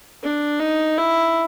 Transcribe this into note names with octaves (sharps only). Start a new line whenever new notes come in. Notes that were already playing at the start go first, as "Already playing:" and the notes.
D4
D#4
E4